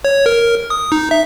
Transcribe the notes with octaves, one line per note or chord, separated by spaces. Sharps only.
C#5
A#4
D#6
D#4
E5